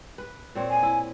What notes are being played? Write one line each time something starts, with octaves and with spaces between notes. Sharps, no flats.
B4
A#2 C4 C#5
G#5
E4